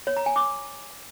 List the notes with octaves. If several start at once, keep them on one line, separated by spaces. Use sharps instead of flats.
C#5
A#5
G#5
D6